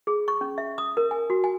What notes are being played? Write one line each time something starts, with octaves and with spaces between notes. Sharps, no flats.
G#4
C#6
C#4
E5
D#6
A#4
G#5
F#4
G#5